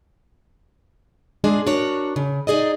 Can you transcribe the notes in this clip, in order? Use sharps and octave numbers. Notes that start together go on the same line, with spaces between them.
G#3 D4 F4 G#4
D4 F#4 A#4 C#5
C#3
D#4 G#4 D5 D#5